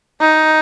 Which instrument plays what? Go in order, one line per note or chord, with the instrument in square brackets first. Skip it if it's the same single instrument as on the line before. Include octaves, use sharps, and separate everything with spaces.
[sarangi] D#4